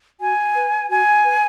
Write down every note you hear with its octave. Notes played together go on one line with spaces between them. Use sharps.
F#4 G#5
B4
F#4 G#5
B4